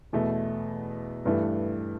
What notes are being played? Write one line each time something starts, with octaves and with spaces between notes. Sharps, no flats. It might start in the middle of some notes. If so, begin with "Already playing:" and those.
E2 B2 A3
G2 E3 A3